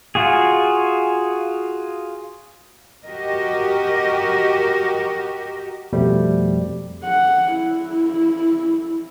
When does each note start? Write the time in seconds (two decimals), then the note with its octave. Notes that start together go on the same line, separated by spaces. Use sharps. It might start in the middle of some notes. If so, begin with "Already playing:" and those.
0.15 F4 F#4 G#4
3.04 F#4 G4 A#4 D#5
5.93 F2 B2 F3 G3 A3
7.04 F#5
7.55 E4